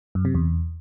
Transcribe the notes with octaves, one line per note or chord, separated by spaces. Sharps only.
F#2
C3
E2